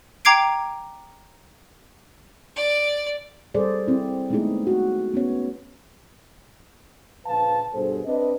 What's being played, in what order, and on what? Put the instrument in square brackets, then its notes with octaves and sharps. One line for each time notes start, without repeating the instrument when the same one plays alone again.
[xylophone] G5 A#5 D6 G#6 C7 D7
[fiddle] D5
[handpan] G3 G#4 A4 C5 D5
C4 E4
G#3 A3 B3 D#4 E4 G#4
F#4
B3 C#4 C#5
[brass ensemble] A#1 C#3 F3 B4 F5 A5
G2 B2 G#4 A4 C5
C4 D4 B4 D#5